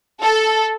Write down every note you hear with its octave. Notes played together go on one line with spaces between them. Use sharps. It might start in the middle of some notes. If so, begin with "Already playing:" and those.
A4